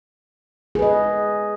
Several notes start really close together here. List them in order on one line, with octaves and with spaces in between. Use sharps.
G#4 B4 D#5